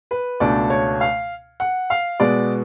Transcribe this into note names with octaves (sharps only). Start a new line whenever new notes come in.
B4
C#2 B2 A3 D4 D5
C#5
F5
F#5
F5
B2 G#3 B3 D5